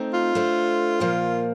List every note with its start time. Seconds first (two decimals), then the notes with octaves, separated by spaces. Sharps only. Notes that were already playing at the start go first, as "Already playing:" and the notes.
Already playing: A3 C4 D#4
0.14 F4
0.35 A3 D4 A4 C5
1.00 A#2 F3 A#3